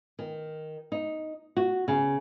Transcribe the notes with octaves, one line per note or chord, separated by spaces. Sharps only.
D#3
D#4
F#4
C#3